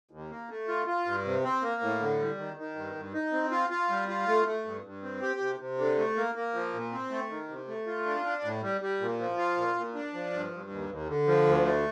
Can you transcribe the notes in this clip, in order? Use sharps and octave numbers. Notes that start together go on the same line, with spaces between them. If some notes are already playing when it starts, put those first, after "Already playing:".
D#2
A#3
A3
F4
F4
G2
C3
C4
A#3
A2
D3
G3
D#3
D#3
G2
G2
D#4
C4
F4
F4
G3
F4
A3
A3
G2
G2
C4
G4
C3
C3
D3
A3
A#3
A#3
F3
A#2
C4
A3
D#3
C3
A3
F4
D4
D4
A2
G3
G3
A#2
F3
F4
A#2
A#2
D4
F3
G2
G2
D#2
D#2
D3
F3
D2
A3